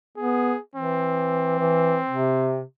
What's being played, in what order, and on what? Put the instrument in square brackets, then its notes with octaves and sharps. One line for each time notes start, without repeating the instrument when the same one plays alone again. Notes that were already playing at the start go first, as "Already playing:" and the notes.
[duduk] B3 [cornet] G#4
[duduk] E3 [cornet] C4
[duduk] E3
C3